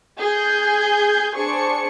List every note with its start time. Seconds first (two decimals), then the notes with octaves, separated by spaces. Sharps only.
0.19 G#4 G6
1.36 D4 G#4 C5 D5 C#6 C#7